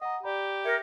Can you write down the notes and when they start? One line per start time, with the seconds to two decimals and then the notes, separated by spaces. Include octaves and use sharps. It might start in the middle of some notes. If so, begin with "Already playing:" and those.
0.01 D#5 F#5 A#5
0.23 G4 D5 A#5 B5
0.65 A#4 E5 G#6 C#7